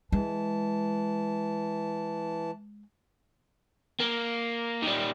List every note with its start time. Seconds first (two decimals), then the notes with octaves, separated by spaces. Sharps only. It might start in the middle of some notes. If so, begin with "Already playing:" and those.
0.12 E3 G#3 A5
4.00 A#3
4.83 D#3 G3